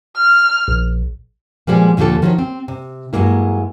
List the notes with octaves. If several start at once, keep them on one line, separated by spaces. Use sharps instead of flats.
F6
A#1
A#2 F3 G3 G#3 B3
D#2 A#2 D3 F3 G4 A4
D#3 F3 F#3 D#4 G4 C#5
C4
C3
G2 F#3 G#3 A#3 E4